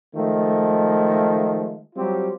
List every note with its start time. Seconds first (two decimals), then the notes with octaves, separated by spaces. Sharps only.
0.15 D#3 F3 G#3 A3
1.95 F#3 G3 C4 F4 G4